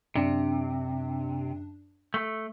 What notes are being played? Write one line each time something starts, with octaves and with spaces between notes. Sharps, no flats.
F#2 C3 D4
A3